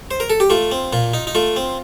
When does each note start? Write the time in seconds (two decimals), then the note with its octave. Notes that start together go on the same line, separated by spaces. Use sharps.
0.11 C5
0.20 A#4
0.30 A4
0.40 G4
0.50 A3 F4
0.72 C4
0.93 A#2 F4
1.14 D#4
1.27 D#4
1.35 A3 F4
1.56 C4